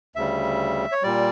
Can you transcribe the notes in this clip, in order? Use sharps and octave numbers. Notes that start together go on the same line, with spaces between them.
D2 C#3 G3 E5
C#5
A#2 G3 D5